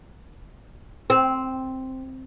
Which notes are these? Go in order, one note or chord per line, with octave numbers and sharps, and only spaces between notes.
C4